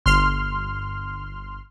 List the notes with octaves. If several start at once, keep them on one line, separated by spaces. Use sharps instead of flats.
G1 C6 F6